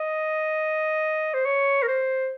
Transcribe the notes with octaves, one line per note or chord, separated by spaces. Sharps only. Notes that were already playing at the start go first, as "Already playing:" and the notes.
Already playing: D#5
C5
C#5
A#4
C5